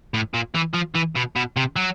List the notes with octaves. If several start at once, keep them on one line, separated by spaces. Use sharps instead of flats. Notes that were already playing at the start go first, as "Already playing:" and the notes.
A2
A#2
E3
F3
E3
B2
B2
C3
F#3